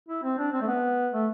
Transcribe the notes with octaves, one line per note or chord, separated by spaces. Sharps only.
E4
C4
D4
C4
A3
B3
A3